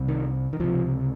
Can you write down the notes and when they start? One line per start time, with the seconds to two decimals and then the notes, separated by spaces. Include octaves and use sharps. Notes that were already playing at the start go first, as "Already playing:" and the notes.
Already playing: C2 C3
0.08 D#3
0.53 D#3
0.59 C#2 C3 F3